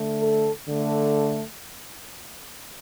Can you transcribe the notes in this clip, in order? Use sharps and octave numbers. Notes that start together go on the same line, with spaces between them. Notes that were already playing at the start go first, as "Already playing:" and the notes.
Already playing: D3 A3
A4
D3 A3